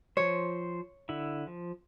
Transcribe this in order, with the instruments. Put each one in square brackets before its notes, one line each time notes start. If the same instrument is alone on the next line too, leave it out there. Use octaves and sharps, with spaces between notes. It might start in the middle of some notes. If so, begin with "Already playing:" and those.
[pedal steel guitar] F3 C5 [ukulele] C#5
[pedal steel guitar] D3 E4
F3